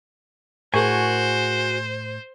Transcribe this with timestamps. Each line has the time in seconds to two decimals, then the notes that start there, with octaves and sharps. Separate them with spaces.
0.74 A2 F#4 G#4 A#4 C5 G#5 C#6